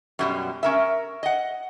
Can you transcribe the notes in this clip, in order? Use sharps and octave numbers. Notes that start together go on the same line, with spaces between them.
F#2 B2 G3
C#4 A#4 E5
D#5 F#5